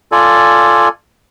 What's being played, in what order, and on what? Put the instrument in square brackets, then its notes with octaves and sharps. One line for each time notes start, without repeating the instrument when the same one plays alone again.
[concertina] F4 A4 D5 G#5